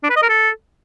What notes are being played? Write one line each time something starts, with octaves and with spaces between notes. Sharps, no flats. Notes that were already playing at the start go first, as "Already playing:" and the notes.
D4
B4
D#5
A#4
A4